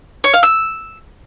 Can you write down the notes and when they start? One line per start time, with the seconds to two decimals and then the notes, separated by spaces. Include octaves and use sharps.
0.24 C#5
0.33 F5
0.43 E6